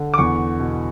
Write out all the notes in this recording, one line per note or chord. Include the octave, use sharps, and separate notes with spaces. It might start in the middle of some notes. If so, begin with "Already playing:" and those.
Already playing: D3
D6
E2 C#6
B2